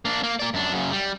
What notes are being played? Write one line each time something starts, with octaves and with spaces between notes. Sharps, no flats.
A#3 D4
A#3
A#3 D5
F#2 D4
F#2 C#3
G3